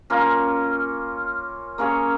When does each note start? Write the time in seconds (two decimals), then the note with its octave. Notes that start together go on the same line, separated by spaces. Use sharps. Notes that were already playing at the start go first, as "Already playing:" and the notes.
0.10 A#3 C#4 F4
1.78 A#3 C#4 G#4 C#5